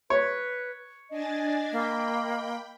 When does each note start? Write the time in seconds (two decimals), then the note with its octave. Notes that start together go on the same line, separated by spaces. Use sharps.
0.10 B4 C#5
1.10 D4 D#5 G#5 A6
1.72 A#3 G5 B5